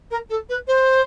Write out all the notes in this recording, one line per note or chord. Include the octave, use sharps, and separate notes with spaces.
A#4
A4
B4
C5